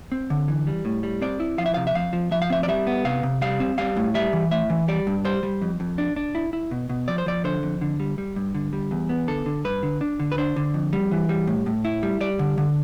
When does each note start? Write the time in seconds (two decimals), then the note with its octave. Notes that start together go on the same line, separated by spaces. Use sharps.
0.12 C4
0.30 D3
0.48 E3
0.67 G3
0.85 A2
1.03 G3
1.22 C4 D5
1.40 E4
1.58 F3 F5
1.66 E5
1.74 C3 F5
1.87 E5
1.95 F2 F5
2.13 F3
2.31 F3 E5
2.42 F5
2.50 C4 E5
2.63 D5
2.68 G3 E5
2.87 B3
3.05 C3 F5
3.23 C3
3.41 G3 F5
3.60 C4
3.78 G3 F5
3.97 A2
4.15 G3 E5
4.33 E3
4.51 A2 E5
4.70 E3
4.88 G3 D5
5.07 G2
5.25 G3 C5
5.43 G3
5.62 F2
5.80 F2
5.98 D4
6.16 D4
6.35 E4
6.53 E4
6.71 B2
6.90 B2
7.08 F3 D5
7.18 C5
7.26 F3 D5
7.44 D3 C5
7.63 F2
7.81 D3
8.00 G3
8.18 G3
8.36 G2
8.55 D3
8.73 G3
8.91 E2
9.09 B3
9.28 D3 A4
9.46 D3
9.65 G2 B4
9.83 D3
10.01 D4
10.20 D3
10.32 B4
10.38 D4 C5
10.56 D3
10.74 F2
10.93 G3
11.11 E3
11.29 G3
11.47 A2
11.66 A2
11.85 E4
12.03 G3
12.21 G3 D5
12.39 D3
12.58 D3